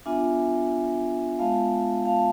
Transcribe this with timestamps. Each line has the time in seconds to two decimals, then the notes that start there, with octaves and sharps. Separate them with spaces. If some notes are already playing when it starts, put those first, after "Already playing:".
0.06 B3 D4 F4 E5 G#5
1.39 G#3 B3 F4 F5 A5
2.05 F5 A5